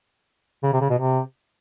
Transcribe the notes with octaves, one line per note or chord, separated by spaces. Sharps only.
C#3
C3
C#3
B2
C3